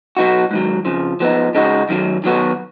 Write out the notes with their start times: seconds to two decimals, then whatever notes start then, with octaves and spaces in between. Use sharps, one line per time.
0.17 B2 F#3 B3 D#4 F#4
0.51 G#2 D#3 F#3
0.85 F2 C#3 F3
1.20 F3 B3 D#4
1.55 C#3 G#3 D#4 F#4
1.89 F#2 D#3 F#3
2.24 D#3 F#3 B3 F#4